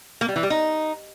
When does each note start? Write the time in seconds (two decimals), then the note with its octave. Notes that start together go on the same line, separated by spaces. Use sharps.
0.21 A#3
0.28 G3
0.36 E3
0.43 G3
0.50 D#4